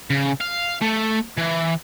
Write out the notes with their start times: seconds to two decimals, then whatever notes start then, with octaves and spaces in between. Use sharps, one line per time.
0.10 C#3
0.40 F5
0.82 A3
1.37 E3